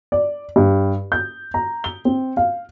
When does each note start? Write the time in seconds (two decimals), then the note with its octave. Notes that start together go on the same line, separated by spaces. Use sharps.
0.12 D5
0.56 G2
1.12 G6
1.54 A#5
1.84 G7
2.05 C4
2.37 F5